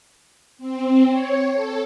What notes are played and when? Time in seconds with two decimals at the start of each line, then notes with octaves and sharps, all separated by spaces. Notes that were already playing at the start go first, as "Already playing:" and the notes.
0.58 C4
1.09 C#5
1.54 A4